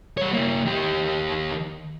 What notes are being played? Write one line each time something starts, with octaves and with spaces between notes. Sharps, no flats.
G3 C#5
A#3 E4
D#3 G4